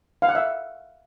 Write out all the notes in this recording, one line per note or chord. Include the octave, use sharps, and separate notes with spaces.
F5
F#5
E5